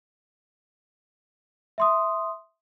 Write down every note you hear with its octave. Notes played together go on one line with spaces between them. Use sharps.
E5 C6 D#6